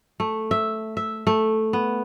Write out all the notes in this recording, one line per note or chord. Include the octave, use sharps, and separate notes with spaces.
A3
E5
E5
A3
B3